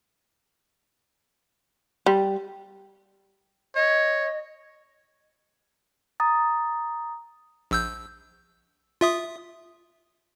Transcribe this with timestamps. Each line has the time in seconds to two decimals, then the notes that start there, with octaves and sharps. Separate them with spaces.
2.06 G3
3.76 C#5 D#5
6.20 A#5 D#6 A6
7.71 A#1 E6 G6
9.01 F4 E5 D#6